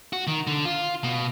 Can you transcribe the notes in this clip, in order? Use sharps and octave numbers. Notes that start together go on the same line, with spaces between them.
F#4
D#3
D3
F4
B2